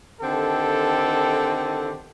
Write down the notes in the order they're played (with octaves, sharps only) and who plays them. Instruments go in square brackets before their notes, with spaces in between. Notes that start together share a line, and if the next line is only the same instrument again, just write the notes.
[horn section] D3 D#3 C4 G4 A4